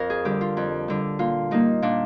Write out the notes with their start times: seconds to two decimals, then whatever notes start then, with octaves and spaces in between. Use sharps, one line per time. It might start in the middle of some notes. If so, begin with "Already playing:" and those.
Already playing: F2 A#4
0.10 G#4
0.25 D3 G3 G4
0.41 F4
0.57 F2
0.88 D3 G3
1.19 A#2 F4
1.51 G3 A#3 D#4
1.82 A#2 D4